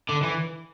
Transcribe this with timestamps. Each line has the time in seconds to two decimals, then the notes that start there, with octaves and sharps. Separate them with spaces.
0.09 D3
0.23 E3